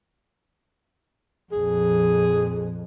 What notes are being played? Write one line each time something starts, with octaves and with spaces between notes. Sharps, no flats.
A#1 F2 G#4